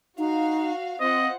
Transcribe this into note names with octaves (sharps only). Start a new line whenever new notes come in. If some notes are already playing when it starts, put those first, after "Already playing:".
D#4 F#4 F5
C4 F4 C5 D#5 F#5